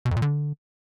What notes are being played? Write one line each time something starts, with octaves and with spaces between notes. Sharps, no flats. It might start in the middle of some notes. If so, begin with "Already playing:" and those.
B2
F2
A#2
D3